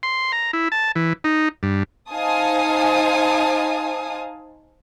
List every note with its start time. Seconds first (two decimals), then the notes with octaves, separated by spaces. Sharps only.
0.03 C6
0.32 A#5
0.53 E4
0.72 A5
0.96 E3
1.24 D#4
1.63 G2
2.11 D#4 C5 F5 G#5 A5 D#6